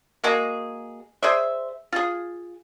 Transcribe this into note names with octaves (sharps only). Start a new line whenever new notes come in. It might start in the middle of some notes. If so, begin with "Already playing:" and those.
G#3 A#3 F#4 G#4
G#4 C5 D5 E5
F4 G#4